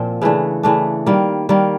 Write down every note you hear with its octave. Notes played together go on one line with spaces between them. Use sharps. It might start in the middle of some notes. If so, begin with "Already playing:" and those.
Already playing: A#2 F3 C4
C#3 E3 A3 D4
C#3 E3 A3 D4
D#3 G3 A#3
D#3 G3 A#3